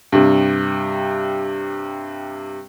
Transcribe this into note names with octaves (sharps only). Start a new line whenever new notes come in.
G2 C3